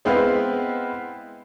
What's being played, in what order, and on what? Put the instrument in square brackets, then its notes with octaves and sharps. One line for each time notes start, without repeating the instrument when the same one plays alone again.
[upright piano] G#3 B3 C4 E4 B4 F5